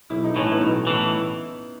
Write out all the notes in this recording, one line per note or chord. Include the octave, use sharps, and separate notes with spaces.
B1 E4
D#4
A2 E3 C#4
B3 D#4
B1
A2 E3